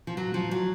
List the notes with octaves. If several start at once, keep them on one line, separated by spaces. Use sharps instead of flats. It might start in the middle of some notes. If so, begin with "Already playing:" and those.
F3
F#3
F3
F#3